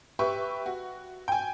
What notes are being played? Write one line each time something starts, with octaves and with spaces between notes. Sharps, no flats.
G4 B4 E5 C#6
F#4
G5 G#5